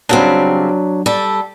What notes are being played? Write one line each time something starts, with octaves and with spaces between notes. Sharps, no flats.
C#3 F#3 G3 C4 D4
G3 A4